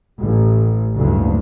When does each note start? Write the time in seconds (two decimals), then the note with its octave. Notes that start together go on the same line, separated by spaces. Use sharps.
0.23 A1
0.96 F#1 D2 G2